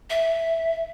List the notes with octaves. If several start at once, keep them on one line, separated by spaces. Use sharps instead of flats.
E5